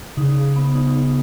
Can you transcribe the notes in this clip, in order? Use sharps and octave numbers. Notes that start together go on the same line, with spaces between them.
C#3 D#4
G#4
B3
D#4
D#4